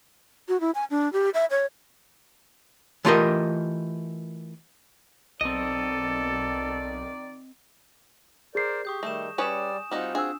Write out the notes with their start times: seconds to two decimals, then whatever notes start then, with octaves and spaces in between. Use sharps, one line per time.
0.49 F#4
0.60 E4
0.75 G#5
0.90 D4
1.13 G4
1.34 E5
1.51 C#5
3.05 E3 A3 F4 G4 A#4 D#5
5.41 B1 D#3 C4 A4 D5 D#5
8.55 G#4 A#4 C5 D5 C7
8.85 G4 C#6 D#6 G6
9.03 D#3 G3 A3 A#6 E7
9.38 G3 C#4 B4 C#5 D5 G#5 D#6 E7
9.91 G3 C4 D#4 F4 F#4
10.15 D4 F#4 G#4 E6